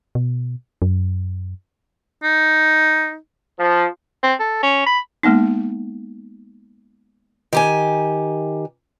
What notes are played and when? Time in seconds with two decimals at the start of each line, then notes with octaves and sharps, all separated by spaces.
0.15 B2
0.82 F#2
2.23 D#4
3.59 F3
4.23 C4
4.40 A4
4.63 C#4
4.86 B5
5.23 G#3 A#3 B3 D#4
7.53 D#3 G4 G#5